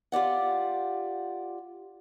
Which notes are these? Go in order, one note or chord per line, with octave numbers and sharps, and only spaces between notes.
F4 G4 D5 F#5